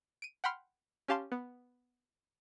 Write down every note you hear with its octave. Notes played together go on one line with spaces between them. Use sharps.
D7 D#7
F#5 G5 B5 C6 F6
C#4 G4 F5 A5 C6
B3